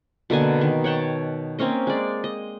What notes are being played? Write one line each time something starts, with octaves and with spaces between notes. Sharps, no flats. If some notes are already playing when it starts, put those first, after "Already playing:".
B2 D3 A#3 G#5
D#3
C#5 F#5 G5 A5
A#3 C4 C#4 D#5
G#3 D5
D#5